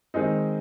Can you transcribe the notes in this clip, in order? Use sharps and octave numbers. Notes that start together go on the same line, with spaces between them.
D#3 G#3 C4 D#4